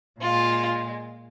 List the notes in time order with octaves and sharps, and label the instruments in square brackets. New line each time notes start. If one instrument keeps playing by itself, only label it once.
[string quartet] A#2 G#3 F4